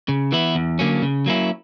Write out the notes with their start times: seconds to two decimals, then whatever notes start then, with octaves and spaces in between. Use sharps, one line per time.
0.09 C#3
0.32 E3 B3 E4
0.55 E2
0.79 D3 F#3 A#3 C#4
1.02 C#3
1.26 F#3 A#3 C#4 E4